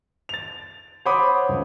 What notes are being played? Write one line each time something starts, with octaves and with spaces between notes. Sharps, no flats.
A6 F7
C5 C#5 F#5 B5 D6 D#6
C#2